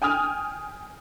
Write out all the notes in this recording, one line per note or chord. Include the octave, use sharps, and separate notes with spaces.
G5 G#5 D#6 F6